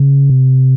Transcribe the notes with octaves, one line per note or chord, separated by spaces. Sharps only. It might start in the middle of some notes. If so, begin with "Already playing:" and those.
Already playing: C#3
C3